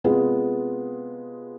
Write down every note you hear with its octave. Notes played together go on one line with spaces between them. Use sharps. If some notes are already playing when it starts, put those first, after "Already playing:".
C3 G#3 B3 F4 G#4